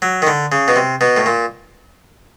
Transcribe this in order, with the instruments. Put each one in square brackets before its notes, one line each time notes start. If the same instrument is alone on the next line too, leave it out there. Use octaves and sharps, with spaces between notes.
[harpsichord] F#3
D#3
D3
C#3
B2
C3
B2
A2
A#2